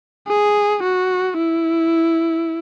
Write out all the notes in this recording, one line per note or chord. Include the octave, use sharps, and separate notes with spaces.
G#4
F#4
E4